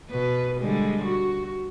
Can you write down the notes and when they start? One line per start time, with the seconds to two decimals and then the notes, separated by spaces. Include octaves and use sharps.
0.11 B2 B4
0.61 D3 G3 G#3
1.05 F#4